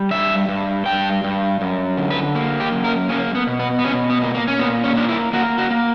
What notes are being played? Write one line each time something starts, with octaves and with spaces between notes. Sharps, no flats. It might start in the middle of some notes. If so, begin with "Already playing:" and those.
Already playing: G3
G2 E5
G2
G2 G5
G2
F#2
D3
B4
A#3
G4
F#2
A#4
A#3 C#4
B3
B2
B3
B3
B2 C#4
B3
A#3
A#3
C#4
A#2 B3
C#4
A#3 D4
E4
A#3 F#4
F#4
A#3